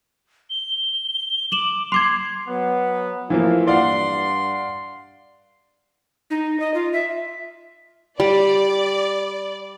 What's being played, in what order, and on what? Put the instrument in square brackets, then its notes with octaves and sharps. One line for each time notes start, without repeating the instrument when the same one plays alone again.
[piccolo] G7
[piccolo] D6 [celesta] E7 F#7
[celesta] C6 D6 G#6 [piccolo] C7
[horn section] F#3 B3
[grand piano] E3 F3 A#3 [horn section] A3 F4
[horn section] G2 C6 [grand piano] D5 F5 F#5
[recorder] D#4
D#5
F4
E5
[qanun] G3 [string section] D5